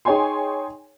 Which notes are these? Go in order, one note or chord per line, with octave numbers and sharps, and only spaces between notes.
D#4 G#4 C#5 G5 G#5 C6